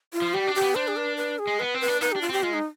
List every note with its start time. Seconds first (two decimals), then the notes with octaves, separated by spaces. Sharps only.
0.13 F4
0.22 F3
0.34 G3 G4
0.47 D4
0.55 G4
0.62 B3
0.75 D4 C5
0.88 G#4
0.97 B4
1.17 B4
1.39 G#4
1.47 G#3
1.59 B3 B4
1.74 C4
1.81 B4
1.88 D4
2.01 D#4 B4
2.12 D4 G4
2.22 F4
2.29 C4 G4
2.43 G#3 F4
2.53 D#4